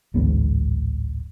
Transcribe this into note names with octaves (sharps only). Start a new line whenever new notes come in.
D1 A1 G#2 B3